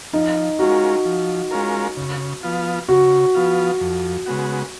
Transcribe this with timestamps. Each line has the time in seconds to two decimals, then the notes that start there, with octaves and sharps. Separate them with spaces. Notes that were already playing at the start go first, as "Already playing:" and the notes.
0.13 F3 D#4
0.59 G#3 C#4 F4 F#4 A#4
1.05 F3
1.51 G#3 C#4 F4 A#4
1.97 C#3
2.43 F3 B3 F4
2.88 C#3 F#4
3.35 F3 B3 F4
3.81 F2
4.26 C#3 G#3 B3 F#4